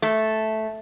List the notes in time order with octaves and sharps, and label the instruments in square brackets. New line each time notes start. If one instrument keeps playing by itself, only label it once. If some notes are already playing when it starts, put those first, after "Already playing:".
[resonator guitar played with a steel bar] A3